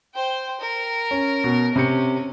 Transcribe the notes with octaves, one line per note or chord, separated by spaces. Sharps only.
C5 G5
A#4
C#4
B2
C3 C#4 C#7